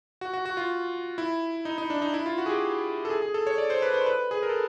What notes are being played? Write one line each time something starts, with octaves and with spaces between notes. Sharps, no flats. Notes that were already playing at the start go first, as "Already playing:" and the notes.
F#4
F#4
F#4
F4
E4
D#4
D#4
D4
D#4
E4
F4
F#4
G#4
G4
A4
G#4
G#4
A4
C#5
D5
C5
B4
C5
B4
G#4
A#4
A4